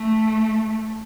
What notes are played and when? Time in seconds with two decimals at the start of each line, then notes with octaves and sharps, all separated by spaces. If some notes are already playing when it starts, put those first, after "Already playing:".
Already playing: A3